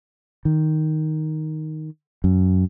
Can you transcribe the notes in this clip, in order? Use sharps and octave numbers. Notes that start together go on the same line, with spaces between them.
D#3
F#2